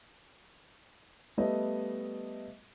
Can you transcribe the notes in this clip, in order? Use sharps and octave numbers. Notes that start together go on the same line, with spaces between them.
G3 A3 B3 D#5